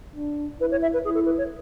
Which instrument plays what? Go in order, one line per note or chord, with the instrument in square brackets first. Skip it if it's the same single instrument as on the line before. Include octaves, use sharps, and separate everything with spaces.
[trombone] D4
[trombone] E4 [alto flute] B4
[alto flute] C#5
E5
B4
[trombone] E4 [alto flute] G#4
[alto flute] A4
B4
C#5